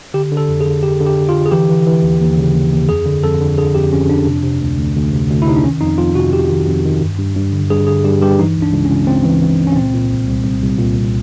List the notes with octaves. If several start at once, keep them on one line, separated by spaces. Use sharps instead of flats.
D3 G4
D3
A4
F2
G#4
D3
D3 G4
D3
G4
D3
F4
D3
G#4
E3 G4
E3
E3
D#2
D#2
C#3
D#2
D#2
F2 G#4
D3
F2 A4
D3
D3 G#4
F2 G4
F2 C#4
F2 D4
C3
C3
D2
D2
D2
C3
D2
E4
C3 D#4
D4
D#3 C#4
F2 D#4
F2 F4
C3 F#4
F2 G4
D#3
F2
D#3
G2
G2
G2
D3
G2 G#4
D3 G#4
G2 G4
G2 G4
E3 D#4
C#2
D4
C#2
C#4
C#2
C#2 C4
E3
E3
C#2
C#4
A#2 C4
A#2
C2
C2
C2
C2
A#2
C2